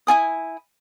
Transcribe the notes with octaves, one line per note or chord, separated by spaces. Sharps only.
E4 F4 G#5 D#6